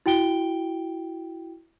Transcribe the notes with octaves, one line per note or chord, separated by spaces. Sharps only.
E4 F#4 G5 D7 G7